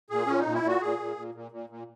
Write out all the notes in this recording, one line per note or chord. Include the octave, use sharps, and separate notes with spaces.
A#2 G#4
A#2 C#4
D#4
A#2
E4
A#2 F#4
A#2 G#4
A#2
A#2
A#2
A#2
A#2